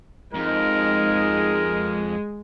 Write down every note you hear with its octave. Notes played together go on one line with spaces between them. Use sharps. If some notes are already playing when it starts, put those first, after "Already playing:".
F2 G#3 D#4 A#4